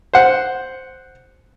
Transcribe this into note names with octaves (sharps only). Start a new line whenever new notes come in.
C5 F#5